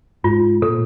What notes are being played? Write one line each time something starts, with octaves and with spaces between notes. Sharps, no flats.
G#2 F4
A#2 A4